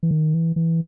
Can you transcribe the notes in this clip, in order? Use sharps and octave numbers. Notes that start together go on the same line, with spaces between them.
E3
D#3
E3
E3